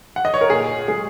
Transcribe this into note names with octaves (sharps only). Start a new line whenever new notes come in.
F#5
D#5
C#5
A#4
A#2 G#4
G#3 G#4